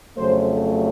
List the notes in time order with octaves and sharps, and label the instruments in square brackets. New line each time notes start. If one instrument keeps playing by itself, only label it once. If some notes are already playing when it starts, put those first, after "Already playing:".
[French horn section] F2 C#3 F#3 A3 C5